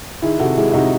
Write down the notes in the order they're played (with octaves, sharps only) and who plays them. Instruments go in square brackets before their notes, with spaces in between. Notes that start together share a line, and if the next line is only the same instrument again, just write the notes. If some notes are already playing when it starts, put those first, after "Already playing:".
[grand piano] D#3 E4 G#4
C3 F#4 A4
G#3 E4 G#4
E4
C3 D#4 F#4